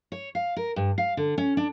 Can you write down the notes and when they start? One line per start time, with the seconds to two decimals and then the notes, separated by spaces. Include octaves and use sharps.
0.12 C#5
0.35 F5
0.57 A#4
0.76 G2
0.98 F5
1.17 D3
1.38 C#4
1.57 D4